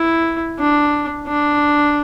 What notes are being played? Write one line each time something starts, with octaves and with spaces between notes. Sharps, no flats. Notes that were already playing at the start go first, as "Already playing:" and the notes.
Already playing: E4
D4
D4